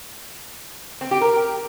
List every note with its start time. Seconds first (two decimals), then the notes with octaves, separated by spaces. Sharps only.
1.01 C4
1.11 G4
1.21 A#4